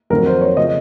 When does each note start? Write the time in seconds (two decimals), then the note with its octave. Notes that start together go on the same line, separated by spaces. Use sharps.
0.10 F2 D#3 F#3 C4 A#4
0.26 C5
0.41 C#5
0.57 C#3 F3 D#5